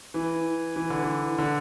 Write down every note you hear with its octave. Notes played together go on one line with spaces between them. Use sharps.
E3
E3
D3
E3
D3